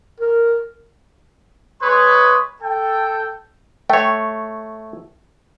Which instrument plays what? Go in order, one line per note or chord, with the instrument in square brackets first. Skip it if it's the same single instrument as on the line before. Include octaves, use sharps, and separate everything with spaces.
[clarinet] A#4
[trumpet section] G#3 B4 C#5 C6 C#6 D#6
A4 G5
[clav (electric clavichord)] A3 C#5 [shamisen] G5